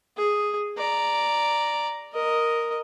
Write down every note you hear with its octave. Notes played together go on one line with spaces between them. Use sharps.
G#4
D5 A#5
A#4 D#5